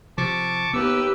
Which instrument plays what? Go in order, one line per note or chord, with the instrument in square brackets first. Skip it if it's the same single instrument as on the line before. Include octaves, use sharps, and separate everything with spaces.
[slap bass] C3 F3 [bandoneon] A5 C#6 D6
[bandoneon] D#2 E6 [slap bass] B3 [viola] G4 B4